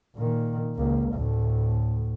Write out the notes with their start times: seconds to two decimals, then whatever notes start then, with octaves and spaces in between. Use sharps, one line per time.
0.16 A#2 D#3
0.76 C#2 A#3
1.14 D2 A2